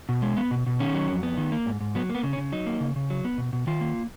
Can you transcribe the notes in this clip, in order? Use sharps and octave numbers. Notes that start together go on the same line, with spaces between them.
B2
G#3
B3
B2
B2
D#3 C#4
F#3
F2
B3
D#3
A#3
G#2
G#2
F#3 B3
A#3
B3
C#3
C#4
C#3
F#3 D#4
A#3
C#3
C#3
F#3
B3
B2
B2
D#3 F4
A#3